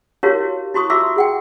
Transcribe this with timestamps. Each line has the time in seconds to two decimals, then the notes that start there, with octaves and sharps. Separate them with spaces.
0.23 E4 F#4 G4 A#4 C#5 F5
0.74 E4 F#4 C6 C#6 D#6
0.90 F4 F#4 E5 C6 D6 E6
1.16 G#4 F#5 G5